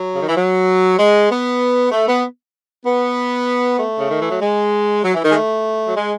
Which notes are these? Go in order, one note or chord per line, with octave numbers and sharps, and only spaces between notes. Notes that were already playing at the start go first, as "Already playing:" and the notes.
Already playing: F#3
C#3
D#3
E3
F#3
G#3
B3
A3
B3
B3
A3
C#3
D#3
E3
F#3
G#3
F#3
E3
D#3
G#3
A3
F#3
G#3